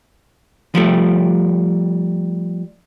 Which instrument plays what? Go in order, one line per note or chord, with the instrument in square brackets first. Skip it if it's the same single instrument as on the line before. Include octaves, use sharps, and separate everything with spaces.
[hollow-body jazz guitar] F3 G3 A3